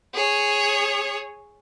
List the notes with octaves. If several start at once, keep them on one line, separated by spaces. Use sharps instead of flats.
G#4 C#5